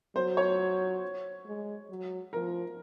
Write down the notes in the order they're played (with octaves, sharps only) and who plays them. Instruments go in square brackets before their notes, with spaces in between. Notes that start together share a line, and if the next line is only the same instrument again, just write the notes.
[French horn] F#3 [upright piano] C5
[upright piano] C#5
[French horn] G#3
F#3
[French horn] F3 [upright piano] A#4